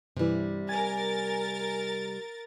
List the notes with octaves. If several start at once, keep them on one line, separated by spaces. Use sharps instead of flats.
G2 C3 E3 G3
A#4 G#5 A6